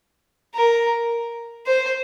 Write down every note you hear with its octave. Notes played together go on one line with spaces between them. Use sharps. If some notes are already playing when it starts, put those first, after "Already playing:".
A#4
C5